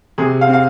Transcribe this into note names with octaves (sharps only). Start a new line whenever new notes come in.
C3 G#4
F5
C4
F5